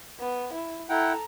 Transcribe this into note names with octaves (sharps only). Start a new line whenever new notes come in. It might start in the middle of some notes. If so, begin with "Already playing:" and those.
B3
E4
E4 A4 F#5 G5 A#5